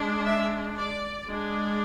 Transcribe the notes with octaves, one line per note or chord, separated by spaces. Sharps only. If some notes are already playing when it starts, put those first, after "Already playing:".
Already playing: G#3 D4
E5
D5
G#3 D4